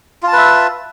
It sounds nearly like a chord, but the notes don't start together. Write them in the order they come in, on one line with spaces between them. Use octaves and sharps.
F4 A5 B4 E5